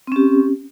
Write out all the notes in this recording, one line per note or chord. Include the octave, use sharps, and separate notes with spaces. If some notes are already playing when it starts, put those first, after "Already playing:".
C4 C#4 G4